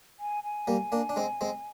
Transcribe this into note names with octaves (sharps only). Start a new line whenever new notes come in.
G#5
G#5
G3 A#3
A#3 D4
D4
G#3 C4
G#3 C4